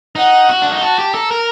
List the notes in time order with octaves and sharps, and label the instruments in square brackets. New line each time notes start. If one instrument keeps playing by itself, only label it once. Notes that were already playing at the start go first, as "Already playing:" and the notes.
[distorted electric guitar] D#4 [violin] F#5
[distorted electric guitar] F#4
D4
D#4
[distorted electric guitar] F#4 [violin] A5
[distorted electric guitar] G4
[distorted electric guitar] A4 [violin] A#5
[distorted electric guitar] A#4